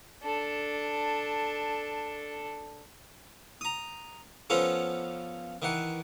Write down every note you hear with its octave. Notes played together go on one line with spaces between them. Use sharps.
D4 A4
A#5 D#6
F3 B3 C#4 F4 A4
D#3 E3 F#5